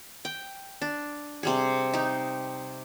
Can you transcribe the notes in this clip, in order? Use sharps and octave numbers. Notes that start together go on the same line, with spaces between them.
G5
D4
C3 G3 G#4
D#4 G4